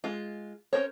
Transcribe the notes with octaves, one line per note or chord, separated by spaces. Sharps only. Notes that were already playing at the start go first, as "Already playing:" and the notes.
G#3 F4
C#4 D4 A#4 C5 C#5